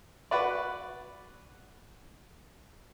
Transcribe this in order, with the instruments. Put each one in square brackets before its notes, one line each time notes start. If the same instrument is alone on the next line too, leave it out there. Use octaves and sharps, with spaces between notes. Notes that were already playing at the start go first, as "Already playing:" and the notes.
[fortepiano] F#4 B4 D5